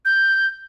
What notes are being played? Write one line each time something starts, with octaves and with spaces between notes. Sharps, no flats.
G6